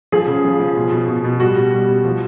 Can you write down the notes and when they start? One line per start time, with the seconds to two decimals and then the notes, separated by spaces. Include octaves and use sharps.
0.12 F3 G#4
0.28 C#3
0.45 F3
0.59 F3
0.76 B2
0.92 B2
1.08 B2
1.24 B2
1.40 G3 F#4
1.57 B2
1.73 G3
1.88 B2
2.05 F3